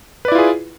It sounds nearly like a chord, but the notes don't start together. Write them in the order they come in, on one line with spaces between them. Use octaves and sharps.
B4 D5 E4 F4 G#4